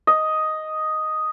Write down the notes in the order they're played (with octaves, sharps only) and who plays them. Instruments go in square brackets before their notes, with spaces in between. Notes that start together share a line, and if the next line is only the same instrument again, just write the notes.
[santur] D#5